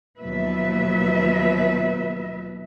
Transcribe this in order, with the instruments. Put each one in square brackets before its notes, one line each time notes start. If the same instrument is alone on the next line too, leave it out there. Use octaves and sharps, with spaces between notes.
[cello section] D#2 B2 F3 F#3 B4 E5